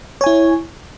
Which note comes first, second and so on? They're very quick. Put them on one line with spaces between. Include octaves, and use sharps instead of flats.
C#5 G#5 E4